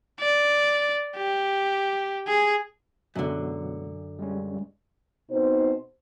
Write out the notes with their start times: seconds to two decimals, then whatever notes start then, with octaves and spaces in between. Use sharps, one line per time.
0.19 D5
1.17 G4
2.28 G#4
3.15 F#2 B2 D3 F#3 G#3
4.19 G3 G#3 C#4
5.30 B2 C4 D#4 C5